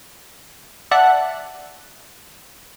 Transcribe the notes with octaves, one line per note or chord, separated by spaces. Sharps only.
D5 E5 F#5 A5 F#6